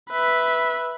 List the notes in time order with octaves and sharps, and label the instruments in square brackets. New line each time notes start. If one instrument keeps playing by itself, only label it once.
[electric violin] B4 E5